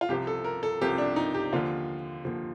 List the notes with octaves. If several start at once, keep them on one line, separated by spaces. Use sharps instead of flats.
F4
C2 C3 F3 G4
A4
A#4
A4
C2 C3 F3 G4
D4
D#4
G4
D#2 D3 F3 F4
D#2 D3 F3